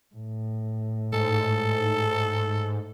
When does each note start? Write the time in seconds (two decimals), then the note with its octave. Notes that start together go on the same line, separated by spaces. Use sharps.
0.15 A2
1.13 G#2 A4